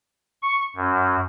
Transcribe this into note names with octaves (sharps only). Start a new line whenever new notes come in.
C#6
F#2